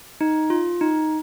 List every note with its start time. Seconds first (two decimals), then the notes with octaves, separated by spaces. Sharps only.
0.21 D#4
0.50 F4
0.81 D#4